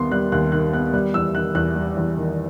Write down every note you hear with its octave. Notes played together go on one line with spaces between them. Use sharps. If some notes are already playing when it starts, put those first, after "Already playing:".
Already playing: D#2 D#3 G3 B3 C6
G3 F#6
D#2 F#6
D#3 F#6
B3 F#6
G3 F#6
E2 E6
D#3 F#6
E2 F#6
G3
E2
D#3